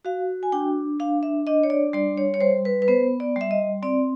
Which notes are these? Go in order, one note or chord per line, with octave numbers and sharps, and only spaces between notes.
F#4 F5
G#5
D4 G5
D4 F5
E5
D4 D#5
C#5
D5
G3 D5
C#5
C#5
G3 C5
B4
B4
B3 C5
D5
G3 E5
D#5
C4 D5